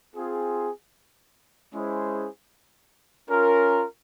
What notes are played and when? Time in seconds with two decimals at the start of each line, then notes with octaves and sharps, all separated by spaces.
0.15 C4 F4 G#4
1.73 G#3 C#4 E4 G#4 C5
3.30 C#4 F4 A#4